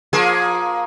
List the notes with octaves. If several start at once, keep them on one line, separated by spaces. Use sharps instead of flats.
F3 A#3 G#4